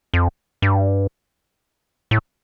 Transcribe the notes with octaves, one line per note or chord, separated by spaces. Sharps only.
F2
G2
A2